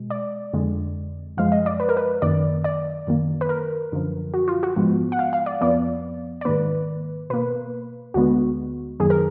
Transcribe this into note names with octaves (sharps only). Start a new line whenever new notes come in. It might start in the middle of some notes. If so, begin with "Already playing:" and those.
Already playing: B2 G#3
D5
F2 D3 G#3
F#2 F3 G#3 F5
D#5
D5
B4
A#4
B4
F#2 D#3 A#3 D5
D5
F#2 D#3 A#3
B4
A#4
F#2 D3 F3
F#4
F4
F#4
G#2 F3 G#3 B3
F#5
F5
F5
D5
F2 F3 B3 D5
D5
G#2 D#3 A#3 B4
B2 A#3 B4
D2 D3 G#3 B3 F#4
F#2 D#3 F#3 A#3 G#4
A#4